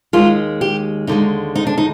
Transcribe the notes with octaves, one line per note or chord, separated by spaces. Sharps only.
D#2 D#3 G#3 F4
G4
D#2 D3 G#3 D#4
D#4
D4
D#4